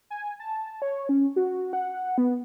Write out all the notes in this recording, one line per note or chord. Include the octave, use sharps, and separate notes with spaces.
G#5
A5
C#5
C#4
F#4
F#5
B3